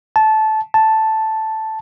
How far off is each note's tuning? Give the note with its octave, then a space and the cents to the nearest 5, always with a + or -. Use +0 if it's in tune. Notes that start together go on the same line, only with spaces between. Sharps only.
A5 -15
A5 +0